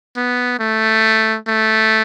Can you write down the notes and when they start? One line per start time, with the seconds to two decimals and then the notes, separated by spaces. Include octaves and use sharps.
0.16 B3
0.60 A3
1.48 A3